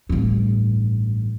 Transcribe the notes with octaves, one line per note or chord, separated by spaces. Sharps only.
A1 G2